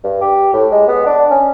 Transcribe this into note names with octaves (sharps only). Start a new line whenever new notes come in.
G2
G4
A2
G#3
B3
D4
C#4